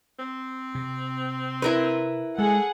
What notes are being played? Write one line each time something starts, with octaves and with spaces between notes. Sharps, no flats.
C4
C3
E4 A#4 B4
G#3 G#4 A4 F#5